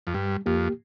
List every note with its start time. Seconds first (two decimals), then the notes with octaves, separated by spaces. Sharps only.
0.07 F2
0.14 G2 G3
0.46 F2 A#3 G4